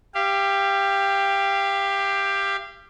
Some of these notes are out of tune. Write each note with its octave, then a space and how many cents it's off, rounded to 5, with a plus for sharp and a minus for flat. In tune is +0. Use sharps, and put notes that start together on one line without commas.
G4 +10 F5 -25